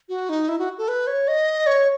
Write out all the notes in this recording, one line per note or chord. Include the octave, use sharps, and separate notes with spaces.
F#4
D#4
E4
F#4
A4
B4
C#5
D#5
C#5